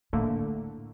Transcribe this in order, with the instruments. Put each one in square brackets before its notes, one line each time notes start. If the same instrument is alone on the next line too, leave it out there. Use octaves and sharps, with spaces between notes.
[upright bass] A2 [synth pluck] D3 A3 A#3